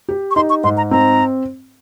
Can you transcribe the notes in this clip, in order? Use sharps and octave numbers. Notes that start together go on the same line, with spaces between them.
G4
C#6
D#4 C6
C#6
G#2 C6
A#5
C4 A#5